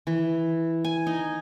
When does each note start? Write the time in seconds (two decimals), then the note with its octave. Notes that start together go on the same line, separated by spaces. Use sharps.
0.07 E3
0.85 G#5
1.07 D#4